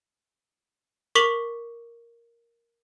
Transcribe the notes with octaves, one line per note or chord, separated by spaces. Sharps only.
A#4 C#6 D6 B6 F7 F#7